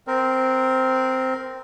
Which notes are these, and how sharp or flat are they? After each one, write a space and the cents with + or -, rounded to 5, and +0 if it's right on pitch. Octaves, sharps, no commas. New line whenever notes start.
C4 -5 A#4 +0